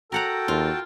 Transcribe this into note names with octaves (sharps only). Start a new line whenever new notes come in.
F#4 A4 A#4 F#5 G5 A5 A#5
D#2 F4